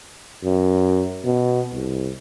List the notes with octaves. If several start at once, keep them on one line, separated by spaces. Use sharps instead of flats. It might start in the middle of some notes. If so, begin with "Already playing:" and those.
F#2
B2
C2